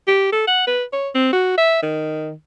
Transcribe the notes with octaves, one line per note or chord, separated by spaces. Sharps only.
G4
A4
F#5
B4
C#5
C4
F#4
E5
D#3